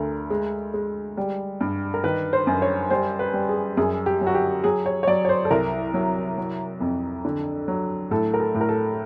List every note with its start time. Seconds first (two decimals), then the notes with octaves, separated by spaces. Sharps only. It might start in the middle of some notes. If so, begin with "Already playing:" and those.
Already playing: D2 D3 A#4
0.30 G#3
0.74 G#3
1.17 G3
1.61 G2
1.94 A#4
2.04 D#3 B4
2.33 C5
2.47 F#2
2.62 C#5
2.90 G3 C5
3.19 B4
3.33 G3
3.49 G#4
3.77 F#2 G#4
4.06 G4
4.21 F#3
4.27 F#4
4.35 G4
4.64 F#3 G#4
4.86 C#5
5.03 C#5
5.07 F#3 D5
5.25 C#5
5.29 C5
5.45 A4
5.50 C2 A#4
5.94 F#3
6.38 F#3
6.80 F2
7.25 D3
7.68 F#3
8.11 A2 A4
8.34 A#4
8.40 A4
8.55 A2
8.61 A#4
8.69 A4